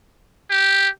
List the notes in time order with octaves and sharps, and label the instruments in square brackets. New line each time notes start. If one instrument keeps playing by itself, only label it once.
[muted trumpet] G4